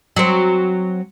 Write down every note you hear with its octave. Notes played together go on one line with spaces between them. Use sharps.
F#3 C4